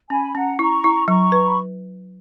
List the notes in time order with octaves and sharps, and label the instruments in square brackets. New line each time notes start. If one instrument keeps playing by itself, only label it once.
[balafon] C#4 [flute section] G#5 B5
[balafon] C#4 [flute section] F#5 A#5
[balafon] E4 [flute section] A#5 C#6
[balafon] E4
[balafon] F#3 [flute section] A#5 C#6
[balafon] B4
[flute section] B5